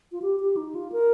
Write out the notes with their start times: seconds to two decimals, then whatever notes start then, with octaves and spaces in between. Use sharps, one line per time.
0.12 F4
0.22 G4
0.40 G4
0.57 D#4
0.75 F4
0.92 A#4